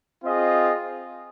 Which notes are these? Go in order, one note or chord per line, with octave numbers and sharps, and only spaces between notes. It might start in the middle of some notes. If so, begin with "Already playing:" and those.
C4 F4 G#4 D#5